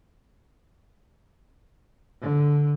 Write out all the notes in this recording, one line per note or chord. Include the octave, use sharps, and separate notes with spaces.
D3